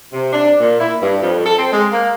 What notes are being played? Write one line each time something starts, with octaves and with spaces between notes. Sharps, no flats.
C3
D4
A#2
E4
G2
F2
A4
C4
G#3
A#3